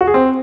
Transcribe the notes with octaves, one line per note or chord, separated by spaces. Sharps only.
F#4
G#4
C4